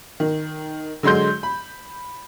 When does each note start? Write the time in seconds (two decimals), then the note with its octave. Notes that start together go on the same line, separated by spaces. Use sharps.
0.20 D#3
1.03 D3 F#3 G#3 C6 G6
1.43 B5